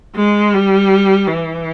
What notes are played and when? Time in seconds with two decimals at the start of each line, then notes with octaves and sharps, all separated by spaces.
0.16 G#3
0.53 G3
1.27 E3